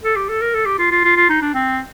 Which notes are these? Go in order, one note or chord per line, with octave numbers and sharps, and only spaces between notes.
A4
G4
A4
A#4
A4
G4
F4
F4
F4
F4
D#4
D4
C4